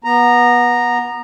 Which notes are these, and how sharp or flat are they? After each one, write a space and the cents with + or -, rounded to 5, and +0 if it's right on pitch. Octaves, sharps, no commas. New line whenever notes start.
B3 -20 A#5 +0